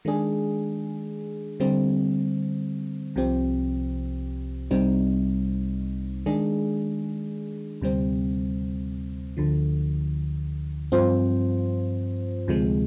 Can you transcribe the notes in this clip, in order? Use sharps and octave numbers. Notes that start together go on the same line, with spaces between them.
D#3 G#3 D4 G#4
D3 G3 C4
C2 C3 F3 C4 G4
C2 C3 G3 C4 D#4
D#3 G#3 D4 G#4
D2 C3 G3 C4
D2 D3 F3
G2 F3 C4 F4 C5
D2 C3 F3 G#3